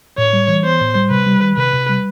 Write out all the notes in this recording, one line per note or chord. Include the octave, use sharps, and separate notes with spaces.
A2 C#5
G3
E3
B3 C5
A2
G3
C3 B4
G3
D#3
C3 B4
C3
G3